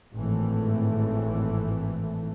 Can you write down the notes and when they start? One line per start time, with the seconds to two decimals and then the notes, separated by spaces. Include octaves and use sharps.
0.14 G#1 A2 E3 A3